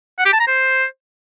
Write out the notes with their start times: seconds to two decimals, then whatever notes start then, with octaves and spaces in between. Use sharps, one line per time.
0.18 F#5
0.26 G4
0.33 A5
0.40 A#5
0.47 C5